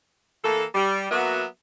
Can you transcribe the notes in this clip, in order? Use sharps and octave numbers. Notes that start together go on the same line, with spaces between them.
E3 A#3 A4
G3
F#3 A#3 B3 F#4 E5